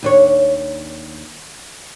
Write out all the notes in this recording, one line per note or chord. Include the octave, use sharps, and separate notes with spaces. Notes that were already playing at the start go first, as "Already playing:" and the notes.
D#2 D4 C#5